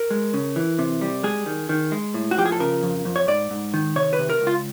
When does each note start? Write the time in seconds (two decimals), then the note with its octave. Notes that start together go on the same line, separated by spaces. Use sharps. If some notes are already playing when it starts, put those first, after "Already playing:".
Already playing: A#4
0.11 G#3
0.34 C#3
0.56 E3
0.79 C3
1.01 G3
1.23 G#3 G#4
1.46 D#3
1.69 D#3
1.92 G#3
2.14 A2
2.31 F#4
2.37 F3 G4
2.46 G#4
2.52 A4
2.60 C#3 A#4
2.83 F2
3.05 F2
3.16 C#5
3.28 G#2 D5
3.51 G#2
3.74 D#3
3.96 C3 C#5
4.13 B4
4.19 C3
4.30 A#4
4.41 C#2
4.47 F4